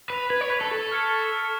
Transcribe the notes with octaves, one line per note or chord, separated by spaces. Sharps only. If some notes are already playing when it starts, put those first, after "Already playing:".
B4 B6 F7
B4 G#6
C#5
B4 B6 F7
A4
A4 C#6
F6 G#6 C#7
C#6
F6 G#6 C#7